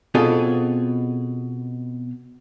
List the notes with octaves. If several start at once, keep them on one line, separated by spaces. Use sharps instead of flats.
B2 C4 F4 G#4 A4 D#5